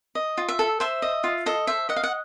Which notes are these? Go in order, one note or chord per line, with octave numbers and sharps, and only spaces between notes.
D#5
F4
E5
A4
C5 E5
D#5
F4
A4 D#5
C5 E5
D#5 F#5
F5
F#5